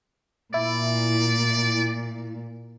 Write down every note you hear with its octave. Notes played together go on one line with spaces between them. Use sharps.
A#2 E4 D5